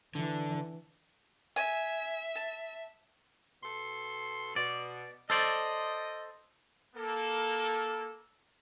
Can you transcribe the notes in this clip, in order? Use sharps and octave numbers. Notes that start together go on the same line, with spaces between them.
D3 E3
E5 G#5
A5
B2 A4 C6
B2 D5
A4 C5 D5 D#5
A#3 A4